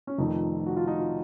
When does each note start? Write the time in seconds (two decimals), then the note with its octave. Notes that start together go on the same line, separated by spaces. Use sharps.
0.07 C#4
0.18 F1 F2 D#3 D#4
0.66 F#4
0.76 F4
0.87 D#4
0.98 F4